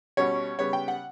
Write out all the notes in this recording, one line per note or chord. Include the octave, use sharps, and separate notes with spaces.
B2 G3 C#4 C#5
C#3 G3 B3 C#5
G5
F#5